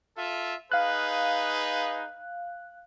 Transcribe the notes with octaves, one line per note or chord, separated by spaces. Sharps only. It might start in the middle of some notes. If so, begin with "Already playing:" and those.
F4 A4 E5
D#4 G#4 B4 F5 F#6